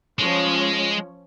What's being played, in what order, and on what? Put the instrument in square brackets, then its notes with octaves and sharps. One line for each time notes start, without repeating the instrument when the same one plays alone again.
[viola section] F3 C#4 C#5 [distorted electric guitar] G#3